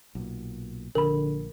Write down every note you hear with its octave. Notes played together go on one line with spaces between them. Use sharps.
B1 A#2
A#1 D3 A#4 B5